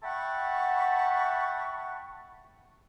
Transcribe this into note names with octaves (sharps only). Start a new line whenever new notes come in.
E5 F#5 G5 A5 B5 C#6